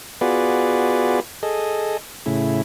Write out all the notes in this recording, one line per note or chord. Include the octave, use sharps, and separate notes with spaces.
B3 F4 F#4 G#4 B4 D5
G#4 A4 D#5
A2 C#3 E4